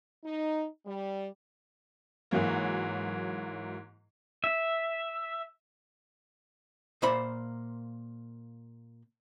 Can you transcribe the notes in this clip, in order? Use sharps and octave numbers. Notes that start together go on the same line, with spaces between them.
D#4
G3
G#2 E3 F#3 A#3
E5
A#2 A#3 C5 E5 B5